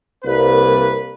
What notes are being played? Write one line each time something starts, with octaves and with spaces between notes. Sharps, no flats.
C2 A#3 B4